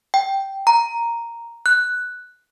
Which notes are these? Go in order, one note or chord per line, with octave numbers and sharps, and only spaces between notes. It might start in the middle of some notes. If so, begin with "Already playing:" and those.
G5
A#5
F#6